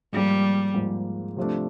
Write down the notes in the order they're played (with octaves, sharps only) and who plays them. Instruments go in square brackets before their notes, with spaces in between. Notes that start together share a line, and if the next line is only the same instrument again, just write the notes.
[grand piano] G#2 F3 A#3 [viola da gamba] G3
[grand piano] G#2 F3 A#3
C3 F3 A3 D4